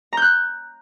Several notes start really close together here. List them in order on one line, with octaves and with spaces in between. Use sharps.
A#5 G6 F#6